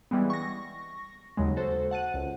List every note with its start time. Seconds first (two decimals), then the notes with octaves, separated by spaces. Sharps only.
0.11 E3 G3 G#3 B3
0.30 C#6 A#6
1.37 D#2 C#3 F#3 G#3
1.56 F#4 A4 C5
1.91 F#5 A5 F#6 D#7
2.14 C#2